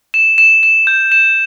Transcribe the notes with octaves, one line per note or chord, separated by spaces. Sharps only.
E7
E7
E7
G6
E7